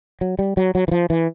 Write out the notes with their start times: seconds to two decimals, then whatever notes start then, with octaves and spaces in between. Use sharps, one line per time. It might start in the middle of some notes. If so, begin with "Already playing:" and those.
0.21 F#3
0.39 G3
0.57 F#3
0.75 F#3
0.88 E3
0.91 F3
1.10 E3